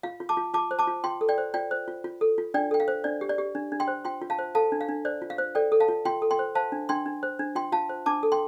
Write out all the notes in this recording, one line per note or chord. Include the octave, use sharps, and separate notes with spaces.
F4 F5
F4
A5 D6
F4
F4 A5 D6
C5
A5 D6
F4
F4 G5 C6
A4
D5 G5
C5
F4 D5 G5
C5
F4
F4
A4
F4
D4 D5 G5
A4 G5
F5
C5
D4 D5
G4
D5
G4
D4
D4
G5 C6
C5
F4 G5 C6
F4
F5 A5
C5
A4 F5 A5
D4
F5
D4
C5 D5
F4
F5
C5
A4 D5 G5
A4
F5 A5
F4
F4 G5 C6
A4
G5 C6
C5
C5 F5 A5
D4
D4 G5 C6
D4
C5
D4
F4 G5 C6
F4 F5 A5
C5
D4 A5 D6
A4
G5 C6